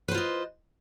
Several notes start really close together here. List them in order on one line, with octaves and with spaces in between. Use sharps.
B4 C5 F4 D#5